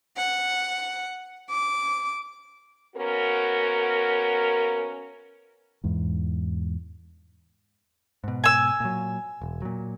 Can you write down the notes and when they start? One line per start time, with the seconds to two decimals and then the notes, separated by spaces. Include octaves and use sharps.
0.17 F#5
1.50 D6
2.96 A#3 B3 C#4 F#4 A#4
5.84 E2 G#2
8.24 G#2 B2
8.44 G#5 E6
8.80 A#2 F#3
9.42 E1
9.62 A#2 F#3